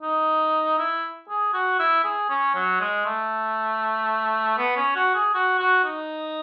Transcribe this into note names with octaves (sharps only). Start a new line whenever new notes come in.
D#4
E4
G#4
F#4
E4
G#4
C#4
F#3
G#3
A3
B3
C#4
F#4
G#4
F#4
F#4
D#4